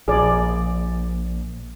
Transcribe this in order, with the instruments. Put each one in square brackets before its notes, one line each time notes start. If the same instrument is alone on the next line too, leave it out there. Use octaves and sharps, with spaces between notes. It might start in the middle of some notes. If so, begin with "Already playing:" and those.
[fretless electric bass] A#1 [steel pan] G#4 D5